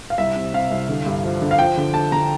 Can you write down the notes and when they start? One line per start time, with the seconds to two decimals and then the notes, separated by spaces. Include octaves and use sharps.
0.10 F5
0.18 C2 E5
0.36 C3
0.53 C3 F5
0.71 C2
0.89 D3
1.06 G2
1.23 F3
1.42 D3
1.51 F5
1.59 F3 G5
1.77 D3
1.94 D3 A5
2.12 D3 A#5